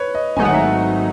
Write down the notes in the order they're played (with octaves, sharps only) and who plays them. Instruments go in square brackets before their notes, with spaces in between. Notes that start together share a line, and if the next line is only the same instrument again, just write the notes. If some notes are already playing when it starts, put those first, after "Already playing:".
Already playing: [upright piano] B4 C#5
D#5
[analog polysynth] G#1 G#2 F#3 A3 D#4 [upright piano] G#5
[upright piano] F#5
E5
F#5